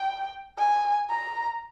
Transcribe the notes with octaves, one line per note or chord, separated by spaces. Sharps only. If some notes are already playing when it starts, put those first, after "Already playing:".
Already playing: G5
G#5
A#5